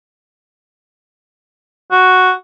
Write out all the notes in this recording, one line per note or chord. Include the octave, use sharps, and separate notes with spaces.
F#4